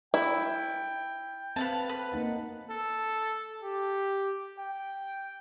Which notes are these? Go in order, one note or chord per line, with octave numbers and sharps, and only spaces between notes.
E4 G5
C4 B4 F5 A5
B4
A#3 D#4 F#5
A4
G4
G5